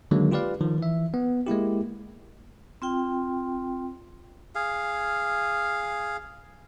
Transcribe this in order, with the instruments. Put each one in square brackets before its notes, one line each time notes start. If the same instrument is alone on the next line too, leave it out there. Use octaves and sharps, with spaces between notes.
[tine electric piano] D3 D#3 F#3 G#3 A#3
F4 G4 B4 D5 F5
D#3 F3
E3 E5
B3
G#3 A#3 E4 G4
[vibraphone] C4 F4 G5
[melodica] G#4 F5